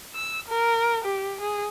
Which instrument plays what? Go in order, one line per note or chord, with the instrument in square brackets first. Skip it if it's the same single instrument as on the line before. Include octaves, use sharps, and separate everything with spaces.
[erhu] E6
A#4
G4
G#4